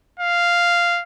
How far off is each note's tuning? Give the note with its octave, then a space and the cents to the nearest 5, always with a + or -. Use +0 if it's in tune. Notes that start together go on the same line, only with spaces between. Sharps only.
F5 -5